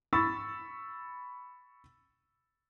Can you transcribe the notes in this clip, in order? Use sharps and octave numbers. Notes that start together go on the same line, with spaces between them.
B5 C#6 E6 A6